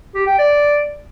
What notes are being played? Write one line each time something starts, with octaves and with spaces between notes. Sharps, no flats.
G4
G5
D5